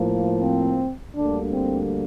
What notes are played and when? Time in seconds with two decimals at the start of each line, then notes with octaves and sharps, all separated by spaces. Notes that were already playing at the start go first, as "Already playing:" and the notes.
Already playing: A2 F3 A#3
0.42 C4
1.16 D2 D3 G3 A#3 D4
1.53 C4